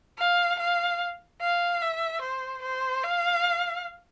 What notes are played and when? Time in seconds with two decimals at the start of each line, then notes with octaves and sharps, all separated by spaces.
0.18 F5
0.59 F5
1.41 F5
1.82 E5
2.22 C5
2.63 C5
3.03 F5